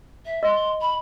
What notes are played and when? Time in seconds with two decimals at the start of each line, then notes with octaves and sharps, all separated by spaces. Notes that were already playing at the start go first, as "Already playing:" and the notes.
0.25 E5
0.43 D#5 C6
0.81 B5